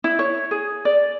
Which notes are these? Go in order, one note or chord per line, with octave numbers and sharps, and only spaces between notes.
E4
C#5
G#4
D5